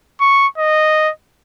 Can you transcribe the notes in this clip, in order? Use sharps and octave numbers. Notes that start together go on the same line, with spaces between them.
C#6
D#5